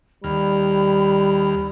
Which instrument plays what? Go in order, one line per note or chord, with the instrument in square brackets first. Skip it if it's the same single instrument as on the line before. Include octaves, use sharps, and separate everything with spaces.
[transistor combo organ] D#2 F6 [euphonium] G3 [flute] B5